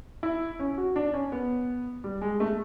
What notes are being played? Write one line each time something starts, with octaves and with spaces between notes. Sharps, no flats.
E4
C#4
F#4
D4
C#4
B3
G3
G#3
A3